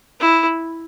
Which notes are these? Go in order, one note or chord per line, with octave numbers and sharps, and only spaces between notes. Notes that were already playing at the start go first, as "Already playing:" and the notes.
E4